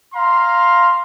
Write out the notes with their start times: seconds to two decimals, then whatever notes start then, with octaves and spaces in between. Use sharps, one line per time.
0.14 F5 A#5 C6